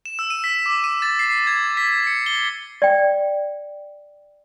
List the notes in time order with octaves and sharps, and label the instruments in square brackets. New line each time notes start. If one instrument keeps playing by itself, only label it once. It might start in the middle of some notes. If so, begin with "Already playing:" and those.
[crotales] E7
E6
D#7
B6
D6
D#7
A6
C7
G#6
B6
C#7
G7
[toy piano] D5 G5